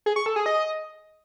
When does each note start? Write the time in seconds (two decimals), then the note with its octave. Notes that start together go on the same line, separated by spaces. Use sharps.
0.06 G#4
0.16 C#6
0.26 A4
0.36 G#4
0.46 D#5